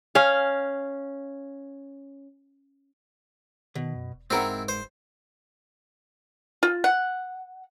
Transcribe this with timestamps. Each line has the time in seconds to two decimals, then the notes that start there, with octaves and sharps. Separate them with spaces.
0.15 C#4 F5
3.75 B2 D#3
3.95 F#2
4.14 E1
4.30 G#2 C4 E4 A#4 F#5
4.69 F#1 C5
6.63 F4
6.84 F#5